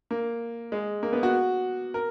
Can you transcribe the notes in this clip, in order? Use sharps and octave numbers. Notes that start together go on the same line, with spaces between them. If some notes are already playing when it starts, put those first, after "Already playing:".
A#3
G#3
A#3
B3
F#4
A#4